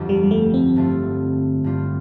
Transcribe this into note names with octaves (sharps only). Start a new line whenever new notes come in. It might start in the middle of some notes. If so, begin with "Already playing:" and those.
Already playing: G1 F2 F3 D4 G4
G3
G3
A3
C4
G2 D3 A3 F4
G2 G3 F4